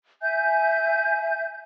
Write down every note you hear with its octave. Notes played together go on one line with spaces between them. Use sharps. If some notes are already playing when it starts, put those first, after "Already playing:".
E5 G#5 G6